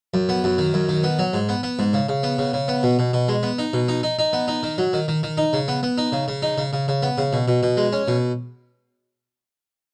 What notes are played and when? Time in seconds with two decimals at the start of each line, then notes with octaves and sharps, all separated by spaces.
0.14 F#2
0.29 B3
0.44 F#2
0.58 D#3
0.74 F#2
0.89 D#3
1.04 B3
1.19 F#3
1.34 G#2
1.49 B3
1.63 B3
1.79 G#2
1.93 C#3
2.09 C#3
2.23 B3
2.39 C#3
2.53 C#3
2.68 B3
2.83 B2
2.99 B2
3.13 B2
3.28 G#3
3.43 B3
3.58 D#4
3.73 B2
3.88 D#4
4.03 D#4
4.19 D#4
4.33 B3
4.48 D#4
4.63 D#3
4.78 F#3
4.93 D#3
5.08 D#3
5.23 D#3
5.37 D#4
5.53 C#3
5.68 B3
5.83 B3
5.98 D#4
6.12 C#3
6.28 C#3
6.42 D#4
6.58 C#3
6.73 C#3
6.88 C#3
7.03 B3
7.18 C#3
7.33 B2
7.48 B2
7.63 B2
7.77 G#3
7.93 C#4
8.08 B2